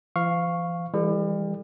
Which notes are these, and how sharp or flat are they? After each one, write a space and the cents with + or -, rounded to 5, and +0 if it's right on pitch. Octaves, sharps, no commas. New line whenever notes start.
F3 -45 F5 +0 C#6 -5
E3 +0 G3 +35 A4 +0